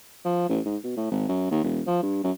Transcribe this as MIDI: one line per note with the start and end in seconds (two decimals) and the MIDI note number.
0.25 0.49 53
0.49 0.60 33
0.66 0.77 44
0.84 0.92 47
0.97 1.07 45
1.11 1.28 32
1.28 1.50 42
1.51 1.60 39
1.64 1.81 28
1.87 2.00 53
2.03 2.22 43
2.24 2.32 42